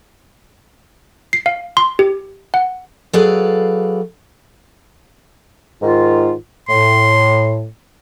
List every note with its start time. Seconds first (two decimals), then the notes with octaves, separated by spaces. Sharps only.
1.33 C7
1.46 F5
1.77 C6
1.99 G4
2.54 F#5
3.13 F#3 G#4 A4 B4 D5 F5
5.82 G#2 D#3 F4
6.69 A2 C6